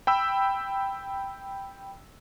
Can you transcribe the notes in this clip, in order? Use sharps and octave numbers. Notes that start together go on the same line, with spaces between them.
G5 B5 E6